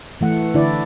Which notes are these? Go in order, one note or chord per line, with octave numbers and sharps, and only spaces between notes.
E3 A3 F#5
D3 D4 E4 D5